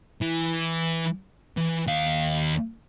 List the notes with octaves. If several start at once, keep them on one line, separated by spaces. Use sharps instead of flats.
E3
E3
D#2 F5